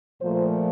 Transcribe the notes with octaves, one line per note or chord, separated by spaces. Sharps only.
A#2 F3 A3 C5